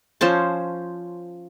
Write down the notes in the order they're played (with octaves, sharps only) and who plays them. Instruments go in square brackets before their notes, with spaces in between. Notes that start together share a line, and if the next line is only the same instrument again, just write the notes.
[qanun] F3 C#4 C5 A5